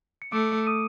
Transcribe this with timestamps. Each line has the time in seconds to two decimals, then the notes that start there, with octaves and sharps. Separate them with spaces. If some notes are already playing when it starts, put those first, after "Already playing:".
0.22 C#7
0.32 A3 D6 D7
0.67 D#6 D#7